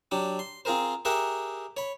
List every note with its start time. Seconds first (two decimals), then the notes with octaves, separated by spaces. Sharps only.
0.11 F#3 D4 G4
0.39 C6
0.65 C4 F4 G#4 A#4 C5
1.05 G4 G#4 A#4 E5 F#5 G5
1.77 C#5 B5